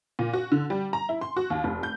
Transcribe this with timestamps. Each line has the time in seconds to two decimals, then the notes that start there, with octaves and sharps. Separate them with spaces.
0.19 A#2
0.33 F#4
0.52 D3
0.70 G3
0.93 A#5
1.09 E4
1.21 C6
1.37 F#4
1.50 D#2
1.64 F1
1.83 G6